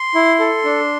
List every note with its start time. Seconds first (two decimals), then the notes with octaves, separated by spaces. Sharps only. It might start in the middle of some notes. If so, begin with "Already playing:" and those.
Already playing: C6
0.15 E4
0.39 A4
0.64 D4